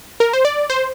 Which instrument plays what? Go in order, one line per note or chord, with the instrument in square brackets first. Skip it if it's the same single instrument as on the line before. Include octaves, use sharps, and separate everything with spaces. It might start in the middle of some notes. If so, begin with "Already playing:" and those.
[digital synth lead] A#4
C5
D5
C5